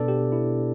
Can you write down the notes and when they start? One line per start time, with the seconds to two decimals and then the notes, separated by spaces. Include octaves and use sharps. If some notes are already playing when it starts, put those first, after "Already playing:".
Already playing: B2 B3 D4 A4 B4 D5
0.08 G4
0.32 E4